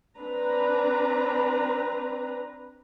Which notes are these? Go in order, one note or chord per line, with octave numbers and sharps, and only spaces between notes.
C4 D4 B4 A#5